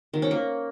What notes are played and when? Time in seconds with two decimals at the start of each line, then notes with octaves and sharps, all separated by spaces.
0.14 D#3
0.22 C#4
0.31 A#3